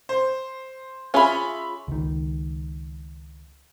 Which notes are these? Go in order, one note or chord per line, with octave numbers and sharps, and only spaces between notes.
C5
C#4 F4 G#4 E5 B5
C#2 D#3